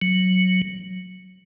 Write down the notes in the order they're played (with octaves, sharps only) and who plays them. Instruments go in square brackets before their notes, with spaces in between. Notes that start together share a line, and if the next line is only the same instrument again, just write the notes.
[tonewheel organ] F#3